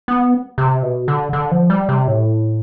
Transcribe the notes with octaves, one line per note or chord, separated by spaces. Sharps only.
B3
C3
B2
D3
D3
F3
G3
C3
A2